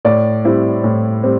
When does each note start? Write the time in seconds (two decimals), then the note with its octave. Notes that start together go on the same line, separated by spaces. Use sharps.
0.05 A2 D5
0.44 G3 C4 E4
0.84 A2
1.24 G3 C4